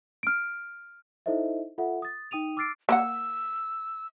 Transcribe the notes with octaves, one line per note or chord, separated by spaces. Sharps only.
F6 D7
D#4 E4 A4 C5 D#5 E5
F4 A4 E5 F#5
D#6 A6
D#4 G5 D#6 D#7 F7
D6 E6 F6 A6 C7 D7
A#3 B4 F#5 E6